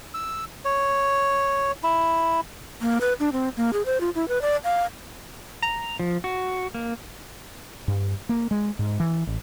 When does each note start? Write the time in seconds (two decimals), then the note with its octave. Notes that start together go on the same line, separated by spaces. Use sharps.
0.14 E6
0.65 C#5
1.83 E4
2.81 A#3
3.01 B4
3.20 D4
3.32 C4
3.57 A#3
3.73 G#4
3.86 C5
4.01 F4
4.15 E4
4.28 B4
4.42 D5
4.64 F5
5.62 A#5
6.00 F3
6.24 F#4
6.75 A#3
7.88 G2
8.29 A#3
8.51 G#3
8.79 G#2
9.00 E3
9.27 A1